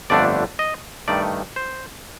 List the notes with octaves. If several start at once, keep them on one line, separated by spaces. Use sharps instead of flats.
G1 F2 D3 A3 D4 D5
D#5
G2 D#3 A3 D5
C5